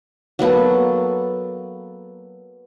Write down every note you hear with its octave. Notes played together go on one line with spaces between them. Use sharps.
F#3 A#3 B3 A4